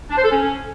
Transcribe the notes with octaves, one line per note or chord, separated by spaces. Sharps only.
D4
C5
A4
C#4